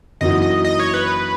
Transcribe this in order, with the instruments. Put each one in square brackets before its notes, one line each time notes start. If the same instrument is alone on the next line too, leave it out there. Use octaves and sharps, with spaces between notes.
[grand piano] F#2 E3 A#3 D#4 F#4 [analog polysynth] D#5
[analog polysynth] D#5
D#5
C#5
B4